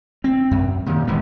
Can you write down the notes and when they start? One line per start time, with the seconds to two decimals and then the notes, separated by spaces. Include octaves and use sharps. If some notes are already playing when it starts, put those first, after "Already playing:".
0.24 C4
0.51 F#2
0.86 A#2 D#3
1.07 D#1 G#2 E3 B3